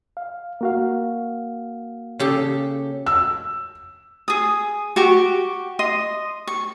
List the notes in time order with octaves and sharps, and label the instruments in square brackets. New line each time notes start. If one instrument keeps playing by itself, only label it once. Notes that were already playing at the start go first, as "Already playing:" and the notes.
[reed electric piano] F5
A#3 F#4 F5
[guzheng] C#3 G4 A4
[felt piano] E6
[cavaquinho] G#4 D#6
F#4 G4 C#6 D6
D#5 C6 D#6
C#6